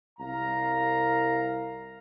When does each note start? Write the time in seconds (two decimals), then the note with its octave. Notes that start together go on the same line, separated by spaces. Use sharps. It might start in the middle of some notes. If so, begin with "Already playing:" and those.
0.19 C2 F5 A#5